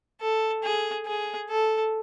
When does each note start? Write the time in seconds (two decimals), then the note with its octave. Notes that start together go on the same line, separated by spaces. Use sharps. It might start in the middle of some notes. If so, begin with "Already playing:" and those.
0.21 A4
0.63 G#4
1.06 G#4
1.50 A4